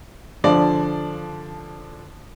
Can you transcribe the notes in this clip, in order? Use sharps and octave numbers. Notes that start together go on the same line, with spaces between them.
D3 F3 D4 D5